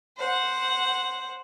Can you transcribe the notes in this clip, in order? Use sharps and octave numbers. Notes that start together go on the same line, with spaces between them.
C5 F#5